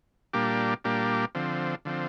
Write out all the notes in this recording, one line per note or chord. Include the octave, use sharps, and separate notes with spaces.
A#2 G3 A#3 D4 G4
A#2 G3 A#3 D4 G4
D3 F3 C4
D3 F3 C4